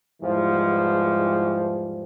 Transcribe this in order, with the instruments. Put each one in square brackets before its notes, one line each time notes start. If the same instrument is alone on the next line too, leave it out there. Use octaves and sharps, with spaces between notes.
[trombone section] E2 G#2 E3 F3 G3